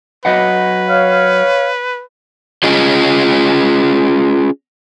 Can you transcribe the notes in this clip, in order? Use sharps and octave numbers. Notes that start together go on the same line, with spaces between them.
F#3 B4 D#5 F#5
C#5 F5
C#4 F4 G#4 D#5